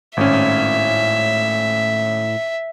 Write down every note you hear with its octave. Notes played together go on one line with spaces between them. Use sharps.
G#1 A2 C#4 E5